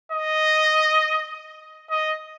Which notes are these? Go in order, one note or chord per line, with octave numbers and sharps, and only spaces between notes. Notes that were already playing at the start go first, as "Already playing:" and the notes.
D#5
D#5